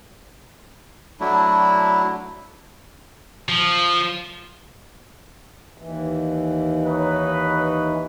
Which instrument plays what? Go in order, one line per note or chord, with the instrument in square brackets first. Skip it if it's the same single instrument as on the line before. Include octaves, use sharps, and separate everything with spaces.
[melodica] F#3 A3 D4 E4
[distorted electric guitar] F3
[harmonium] D#2 E3
[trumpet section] D#4 B4 C#5